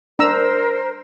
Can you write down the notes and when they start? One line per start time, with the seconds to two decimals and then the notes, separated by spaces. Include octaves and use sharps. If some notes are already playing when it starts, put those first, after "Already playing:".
0.19 D4 A#4 C5 A#5 E6